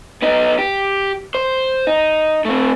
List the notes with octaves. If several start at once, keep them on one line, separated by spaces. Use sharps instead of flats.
B3 D#4
G4
C5
D#4
A3 C4